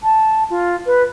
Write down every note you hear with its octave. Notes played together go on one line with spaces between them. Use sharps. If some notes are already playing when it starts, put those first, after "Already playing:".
A5
F4
B4